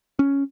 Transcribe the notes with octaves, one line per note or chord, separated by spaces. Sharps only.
C#4